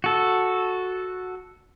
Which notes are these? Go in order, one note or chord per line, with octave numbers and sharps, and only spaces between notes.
F#4 A4